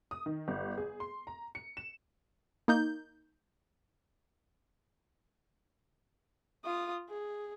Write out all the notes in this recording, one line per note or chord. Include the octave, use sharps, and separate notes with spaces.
D#6
D#3
G1
G#4
C6
A#5
C#7
E7
A#3 D#4 G6
F4 D#6
G#4